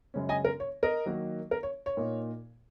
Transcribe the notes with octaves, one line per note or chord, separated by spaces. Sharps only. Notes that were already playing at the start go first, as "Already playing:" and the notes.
F#2 C#3 G#3 C#4
D#5 G#5
A#4
C#5
A#4 D#5
D#3 F#3 A#3 D#4
A#4
C#5
C#5
A#2 A#3 D#4